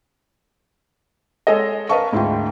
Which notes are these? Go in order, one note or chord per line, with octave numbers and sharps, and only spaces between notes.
G#3 G#4 A4 C#5 D#5
A#4 B4 D#5 F5 A5 C#6
D2 G#2 E4 F4 G5